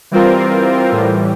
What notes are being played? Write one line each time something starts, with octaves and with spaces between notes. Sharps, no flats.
E3 G3 C4 F4 A#4
A2 E3 G3